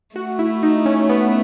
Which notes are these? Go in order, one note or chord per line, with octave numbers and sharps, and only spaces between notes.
A3 F#4
E4
D#4
C#4
B3